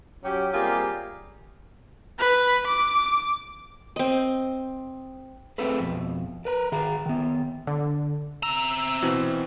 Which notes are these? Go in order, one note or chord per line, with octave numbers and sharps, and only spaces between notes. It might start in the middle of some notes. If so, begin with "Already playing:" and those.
F#3 C#4 G4
C3 G3 A#3 F4 G4 G#4
B4
D6
C4 D#5
A3 C4 G#4 A4 B4
F2 B2
A#4 B4 A#5
D#3 G#4 A#5
D#3 B3
D3
C3 A#5 E6
B2 E3 C4